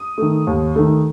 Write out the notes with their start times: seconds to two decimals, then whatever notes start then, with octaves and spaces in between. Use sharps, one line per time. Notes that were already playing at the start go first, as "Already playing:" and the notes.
Already playing: D#6
0.18 D#3 A3
0.47 D#2
0.76 D#3 A3